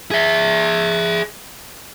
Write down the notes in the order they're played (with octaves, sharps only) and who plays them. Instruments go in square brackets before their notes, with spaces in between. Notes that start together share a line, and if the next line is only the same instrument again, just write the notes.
[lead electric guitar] G#4 E5